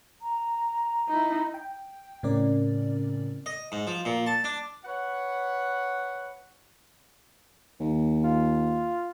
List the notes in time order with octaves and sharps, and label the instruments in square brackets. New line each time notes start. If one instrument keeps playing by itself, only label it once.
[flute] A#5
[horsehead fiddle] D#4 E4
[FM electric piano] G5
A2 C#3 C4 C#4 A#4 D5
[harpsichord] D#5
G#2
F3
A#2
A5
D4
[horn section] B4 C#5 F#5
[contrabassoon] D#2
[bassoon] F4